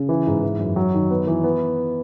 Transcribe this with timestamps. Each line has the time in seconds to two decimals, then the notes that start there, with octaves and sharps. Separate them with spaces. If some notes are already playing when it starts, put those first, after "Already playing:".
Already playing: C#3
0.09 E3
0.27 G#2
0.43 E3
0.59 F#2
0.76 F#3
0.94 D#3
1.11 B3
1.27 E3
1.44 B3